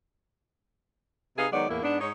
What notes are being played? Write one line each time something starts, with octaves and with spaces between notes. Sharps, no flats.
C3 D#4 G#4 B4 F5
D#3 F#3 G#3 B3 D5
E2 A2 A#3 E4
G#2 B3 D4
G#2 D#4 C#5